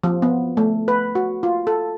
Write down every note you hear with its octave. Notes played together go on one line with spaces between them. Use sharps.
F3
B3
A3
B4
F#4
F4
A4